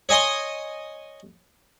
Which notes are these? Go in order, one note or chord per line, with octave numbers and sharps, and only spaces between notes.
C#5 D#5 G#5 C6 D#6